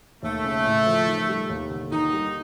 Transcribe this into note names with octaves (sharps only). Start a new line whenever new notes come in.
D#2 A3
C#3
A2
F3
D#3
G3
D#2
D3
D#3 D#4
G3